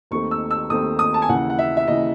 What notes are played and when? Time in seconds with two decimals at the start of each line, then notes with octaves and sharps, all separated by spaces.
0.11 D#2 D#3 A3 C4 C#6
0.31 E6
0.51 E6
0.70 D#2 D#3 A3 C4 D#6
0.99 D#6
1.14 A5
1.22 G#5
1.29 D#2 C#3 E3 F#5
1.50 F#5
1.59 E5
1.77 E5
1.87 D#2 C#3 E3 D#5